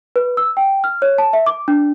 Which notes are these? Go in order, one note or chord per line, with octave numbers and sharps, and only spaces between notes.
B4
E6
G5
F6
C#5
A5
E5
D6
D4